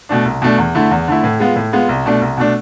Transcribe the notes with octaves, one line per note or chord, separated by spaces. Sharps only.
B2 A3 D4
C2
B2 A3 D4
E2
D3 A3 E4
E2
D3 A3 E4
A2
G#3 B3 F4
A2
G#3 B3 F4
C2
B2 A3 D4
C2
B2 A3 D4